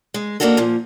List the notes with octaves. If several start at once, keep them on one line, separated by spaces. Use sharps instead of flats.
G#3
A#3 B3 D4 D#4 F#4 A4
A#2 F3